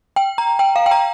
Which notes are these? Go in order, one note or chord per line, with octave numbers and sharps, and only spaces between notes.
G5
A#5
G5
F5
G5
A#5